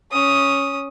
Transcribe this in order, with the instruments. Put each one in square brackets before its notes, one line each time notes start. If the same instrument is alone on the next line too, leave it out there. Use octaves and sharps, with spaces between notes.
[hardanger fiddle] C#4 D#6